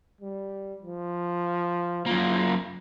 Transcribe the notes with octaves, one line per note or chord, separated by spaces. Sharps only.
G3
F3
F#2 A#3 F4